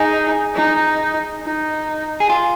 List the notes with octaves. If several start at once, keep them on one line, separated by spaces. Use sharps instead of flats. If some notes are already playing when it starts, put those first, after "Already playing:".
Already playing: D#4 G#4
D#4
D#4
G#4
F4